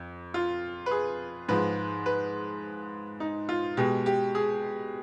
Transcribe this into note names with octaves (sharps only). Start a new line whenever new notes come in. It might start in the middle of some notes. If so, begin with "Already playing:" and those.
Already playing: F2
F4
B4
G#4
G#2 F3 G#3 B4
B4
D#4
F4
B2 G#3 G4
G4
G#4